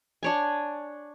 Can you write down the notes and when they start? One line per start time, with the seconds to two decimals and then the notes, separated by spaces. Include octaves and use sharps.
0.23 D4 C#5 G#5